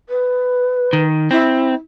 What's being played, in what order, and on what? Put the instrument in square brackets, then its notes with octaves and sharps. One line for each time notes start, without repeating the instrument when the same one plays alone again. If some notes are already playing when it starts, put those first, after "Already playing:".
[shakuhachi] B4
[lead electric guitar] D#3
[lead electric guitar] C4 [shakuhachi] E4